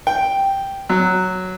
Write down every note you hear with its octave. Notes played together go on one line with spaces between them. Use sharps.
G5
F#3